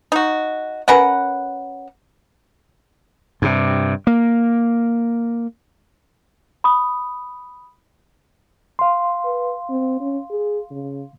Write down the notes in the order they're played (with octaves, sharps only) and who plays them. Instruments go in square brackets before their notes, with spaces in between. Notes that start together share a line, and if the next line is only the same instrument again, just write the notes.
[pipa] D#4 F#4
C#4 A#4 B4 F#5
[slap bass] G2 C3
A#3
[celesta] B5 D#6
[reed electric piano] F5 C6
[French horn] B4
C4
C#4
G#4
C#3